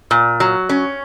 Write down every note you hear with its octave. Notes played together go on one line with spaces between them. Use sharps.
A#2
F#3
C#4